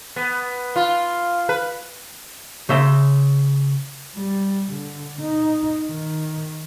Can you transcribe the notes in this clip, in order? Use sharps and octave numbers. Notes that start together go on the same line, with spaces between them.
B3
F4
B4
C#3 E5 C6
G3
D3
D#4
D#3